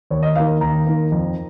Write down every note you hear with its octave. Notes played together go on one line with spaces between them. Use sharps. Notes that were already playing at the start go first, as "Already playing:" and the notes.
D#2 C#5
D#5
D#3 A#3 F5
D#2 A#5
D#3 A#3
F2